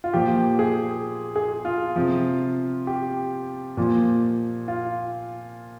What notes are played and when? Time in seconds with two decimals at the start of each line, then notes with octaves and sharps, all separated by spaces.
0.04 F4
0.13 A#2 F3 G4
0.59 G#4
1.36 G#4
1.65 F4
1.96 C3 F3
2.87 G4
3.77 A#2 F3
4.68 F4